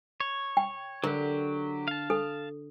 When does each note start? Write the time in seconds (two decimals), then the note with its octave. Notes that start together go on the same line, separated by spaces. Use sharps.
0.20 C#5
0.57 G5
1.04 D3 F#3 G4 A#4
1.88 F5 A5
2.10 A4